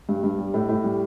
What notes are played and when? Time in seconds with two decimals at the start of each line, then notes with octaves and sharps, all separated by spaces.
0.09 G2
0.24 G2
0.38 G3
0.54 A2
0.69 A2
0.84 G3